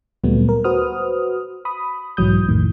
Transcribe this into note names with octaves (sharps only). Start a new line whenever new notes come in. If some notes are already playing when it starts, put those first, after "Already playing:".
D2 A#2 F#3 G3 A3 B3
A#4
F#4 B4 C5 D#6 F6
B5 D#6
B1 G#2 E3 F#3 D#6 G6
F2 A2 D#3